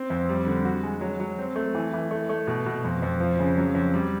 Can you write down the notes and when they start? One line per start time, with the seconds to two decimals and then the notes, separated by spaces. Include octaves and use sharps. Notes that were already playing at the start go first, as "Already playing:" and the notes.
Already playing: C4
0.10 F2
0.29 G3
0.46 D3
0.65 F#4
0.83 G#3
1.01 F#3
1.20 F#3
1.39 C4
1.56 A3
1.75 E3
1.93 E3
2.11 A3
2.29 A3
2.47 B2
2.66 B2
2.84 F2
3.02 F2
3.20 F3
3.39 C#3
3.57 F#3
3.75 F2
3.94 G3